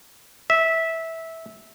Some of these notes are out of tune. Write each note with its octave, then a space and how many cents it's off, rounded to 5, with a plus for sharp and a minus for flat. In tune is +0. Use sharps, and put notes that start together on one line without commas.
E5 -15